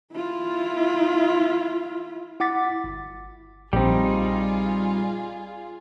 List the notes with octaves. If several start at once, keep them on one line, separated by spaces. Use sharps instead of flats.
E4 F4
E4 F#5 D6 A6 B6
G1
A#1 G3 C4 D#4 F4 G4 G#4